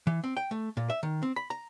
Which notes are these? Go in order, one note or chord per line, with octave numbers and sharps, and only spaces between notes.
E3
C4
G5
A3
A#2
E5
D#3
C4
B5
A#5